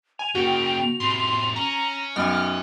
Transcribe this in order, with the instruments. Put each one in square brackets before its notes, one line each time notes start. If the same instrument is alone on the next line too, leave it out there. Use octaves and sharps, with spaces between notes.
[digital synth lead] G#5 [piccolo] F7
[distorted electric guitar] C#3 A#3 [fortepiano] F#4 [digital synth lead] G5
[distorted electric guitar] A2 C3 [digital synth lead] C6
[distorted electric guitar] C#4 [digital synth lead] A#5
[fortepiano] B1 F#2 [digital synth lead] F6